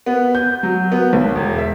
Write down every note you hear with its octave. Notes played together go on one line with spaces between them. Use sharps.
B3
G6
F#3
B3
B1
E1
E5